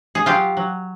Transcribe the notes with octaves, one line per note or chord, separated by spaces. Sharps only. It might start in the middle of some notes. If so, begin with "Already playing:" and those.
G#4
F#3 F4 G4
F#3